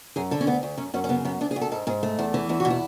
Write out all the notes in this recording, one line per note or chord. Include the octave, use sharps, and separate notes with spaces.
F#2 G#4
D3 A4
C#4
D2 B3
D2
F#2 C#4
F#2 C#4
C#4
C#3 B3
F#2 B3
D2 D4
G#4
D2
A4
G#2 A4
G#2 G#4
A3
E2 E4
E3
E2 E4
B2 F#4
E4